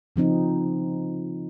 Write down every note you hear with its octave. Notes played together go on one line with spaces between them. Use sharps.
C#3 F3 C4 D#4